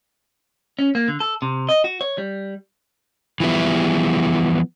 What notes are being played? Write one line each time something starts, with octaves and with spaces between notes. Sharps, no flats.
C#4
A#3
D3
A4
C3
D#5
F#4
C#5
G3
E3 F3 G3 B3 E4